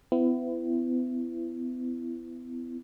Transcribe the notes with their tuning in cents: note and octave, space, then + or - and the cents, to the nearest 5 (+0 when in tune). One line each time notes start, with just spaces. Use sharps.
B3 +40 E4 +25